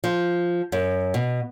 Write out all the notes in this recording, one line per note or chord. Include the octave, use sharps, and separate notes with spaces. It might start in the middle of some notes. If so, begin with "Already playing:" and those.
F3
F#2
B2